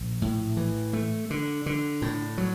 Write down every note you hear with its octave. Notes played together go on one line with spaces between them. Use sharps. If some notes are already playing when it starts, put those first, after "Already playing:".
Already playing: A#1
A2
E3
A3
D3
D3
A2
F#3